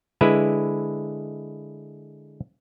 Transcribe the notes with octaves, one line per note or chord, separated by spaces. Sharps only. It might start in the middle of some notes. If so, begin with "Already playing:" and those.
D3 G#3 E4 B4